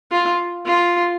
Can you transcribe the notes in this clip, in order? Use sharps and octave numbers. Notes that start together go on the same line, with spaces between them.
F4
F4